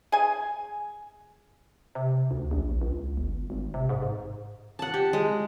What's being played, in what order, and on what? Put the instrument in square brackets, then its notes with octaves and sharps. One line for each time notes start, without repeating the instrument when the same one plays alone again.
[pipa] G#4 G#5
[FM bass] C3
D2
A#1
C#2
G1
G#1
C3
G#2
G#2
[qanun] F#5 A5
G4
G#3